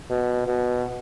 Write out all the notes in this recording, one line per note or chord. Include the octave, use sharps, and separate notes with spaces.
B2
B2